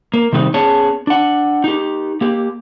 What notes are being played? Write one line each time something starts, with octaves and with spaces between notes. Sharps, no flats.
A#3
C3 D#3 G3 C4 D#4
B3 C#4 G#4 C#5 A5
D4 F#5
D#4 G4
A#3 G4